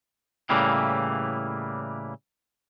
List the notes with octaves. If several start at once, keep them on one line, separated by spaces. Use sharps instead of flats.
A2 C#3 E3 G3 A#3